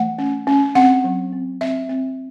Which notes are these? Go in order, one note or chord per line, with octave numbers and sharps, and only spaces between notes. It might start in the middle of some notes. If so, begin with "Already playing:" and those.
Already playing: E3 A3 F#5
C#4
C#4
C4 F#5
F#3
C4
C4 E5
C4